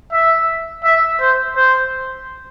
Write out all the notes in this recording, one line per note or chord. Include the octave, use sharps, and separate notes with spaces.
E5
E5
C5
C5